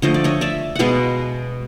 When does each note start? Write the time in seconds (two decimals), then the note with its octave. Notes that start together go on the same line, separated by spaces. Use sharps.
0.02 D3 F3 A3 D#5
0.14 D5
0.24 C#5 D#5
0.41 D5 E5
0.75 B2 G#3 B3 D#5 F5 F#5